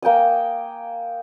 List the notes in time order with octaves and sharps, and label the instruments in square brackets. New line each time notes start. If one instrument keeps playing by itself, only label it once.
[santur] A#3 G5 G#5 D#6